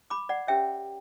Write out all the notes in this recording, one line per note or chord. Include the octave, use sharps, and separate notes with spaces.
B5 D6
D5 F#5
C#4 G4 A#4 C#5 E5 G5